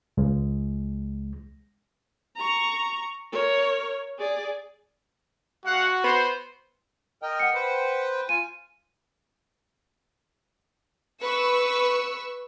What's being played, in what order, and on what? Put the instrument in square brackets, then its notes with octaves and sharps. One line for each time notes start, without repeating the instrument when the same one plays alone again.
[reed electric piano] C#2 G#3
[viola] A#5 C#6
A#4 C#5
G#4 D5
[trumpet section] G#3 F5 F#5 [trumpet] F#4
[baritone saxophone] B3 [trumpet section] C5
[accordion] A#4 D#5 G5
[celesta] F#5 C#7
[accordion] B4 C5 G5
[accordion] F4 G#5 [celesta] D#7
[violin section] B4 C#6 E6